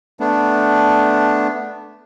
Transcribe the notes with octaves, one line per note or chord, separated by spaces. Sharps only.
A3 B3 D4